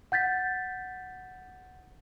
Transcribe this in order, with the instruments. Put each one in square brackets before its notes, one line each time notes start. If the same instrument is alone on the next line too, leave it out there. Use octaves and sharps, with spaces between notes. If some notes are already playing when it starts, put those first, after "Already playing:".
[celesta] F#5 G6 A6 B6